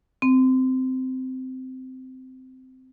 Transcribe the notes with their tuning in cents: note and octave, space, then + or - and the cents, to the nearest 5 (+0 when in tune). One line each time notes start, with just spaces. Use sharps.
C4 -15